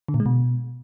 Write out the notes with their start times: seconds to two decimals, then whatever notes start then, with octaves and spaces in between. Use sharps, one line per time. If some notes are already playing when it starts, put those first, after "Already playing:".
0.08 D3
0.14 A#2
0.20 G#3
0.26 B2